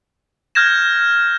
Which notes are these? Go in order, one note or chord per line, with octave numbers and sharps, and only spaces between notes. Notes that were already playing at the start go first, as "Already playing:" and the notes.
F6 G6 G#6 A#6 E7